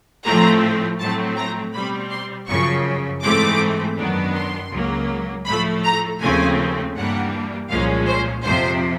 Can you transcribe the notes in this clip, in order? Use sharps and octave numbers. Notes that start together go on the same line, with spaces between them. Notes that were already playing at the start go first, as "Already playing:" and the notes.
A2 F3 A3 C4 A#5
A2 F#3 A3 C4 A5
A#5
B2 G3 C4 B5
C6
F#2 C#3 F3 C#6
G#2 E3 A3 C4 D6
F#2 D#3 F#3 B3 D4
C6
C#2 C#3 F#3 A#3
A2 F3 A3 B5
A#5
D#2 C#3 F3 A3 C4 G#5
G2 E3 G3 A#3 D4 F#5
C2 A#2 F3 G#3 C#4 F5
C5
F2 C3 F3 C5